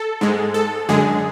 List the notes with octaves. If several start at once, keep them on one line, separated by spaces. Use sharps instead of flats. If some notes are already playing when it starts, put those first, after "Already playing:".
Already playing: A4
G#2 G#3
A4
F#2 D3 G#3 G#4